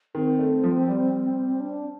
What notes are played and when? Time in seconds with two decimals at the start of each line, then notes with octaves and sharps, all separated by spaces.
0.15 D#3 C4
0.39 A3
0.64 F3
0.88 G3
1.60 D4